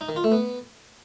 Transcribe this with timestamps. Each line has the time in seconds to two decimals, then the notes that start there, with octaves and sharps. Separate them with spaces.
0.01 D#4
0.09 D#3
0.16 F4
0.24 A3
0.32 B3